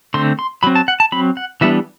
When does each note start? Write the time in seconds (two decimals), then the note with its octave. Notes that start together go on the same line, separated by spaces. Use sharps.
0.14 D3 A3 C4 C6
0.39 C6
0.63 F#3 C4 B5
0.75 A5
0.88 F#5
1.00 A5
1.12 F#3 C4 B5
1.37 F#5
1.61 E3 G3 B3 D4 E5